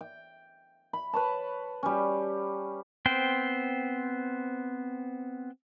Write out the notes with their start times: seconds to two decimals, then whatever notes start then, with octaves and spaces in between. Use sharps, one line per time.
0.01 G5
0.93 B5
1.13 B4 C#5 A5
1.83 G3 C#4
3.06 B3 C4 C5 G5